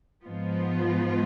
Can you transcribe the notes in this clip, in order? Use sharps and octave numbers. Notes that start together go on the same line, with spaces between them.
G#2 F3 B3 F4